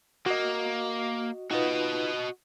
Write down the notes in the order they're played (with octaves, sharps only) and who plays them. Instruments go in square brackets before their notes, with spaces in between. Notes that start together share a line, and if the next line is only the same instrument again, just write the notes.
[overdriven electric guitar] A#3 [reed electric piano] F#4 D#5
[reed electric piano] D#4 F4 B4 [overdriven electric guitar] F#4 D#5